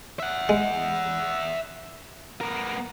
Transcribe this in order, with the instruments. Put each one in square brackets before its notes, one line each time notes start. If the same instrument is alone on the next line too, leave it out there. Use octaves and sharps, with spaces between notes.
[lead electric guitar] E5 F#5
[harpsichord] G#3
[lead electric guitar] B3 A#4